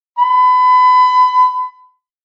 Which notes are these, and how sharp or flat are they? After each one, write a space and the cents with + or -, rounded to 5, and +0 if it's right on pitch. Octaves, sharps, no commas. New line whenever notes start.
B5 +30